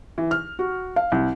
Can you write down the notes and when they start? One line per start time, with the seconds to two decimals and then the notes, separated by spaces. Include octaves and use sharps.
0.18 E3
0.31 F6
0.59 F#4
0.96 F5
1.12 C2